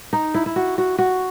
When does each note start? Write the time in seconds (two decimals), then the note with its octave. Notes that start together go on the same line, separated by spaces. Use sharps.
0.13 D#4
0.34 E4
0.46 E4
0.56 F#4
0.78 F#4
0.98 F#4